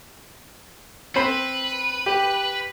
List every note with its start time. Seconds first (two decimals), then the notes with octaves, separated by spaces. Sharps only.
1.16 C4 B4 C5 B5
2.06 G4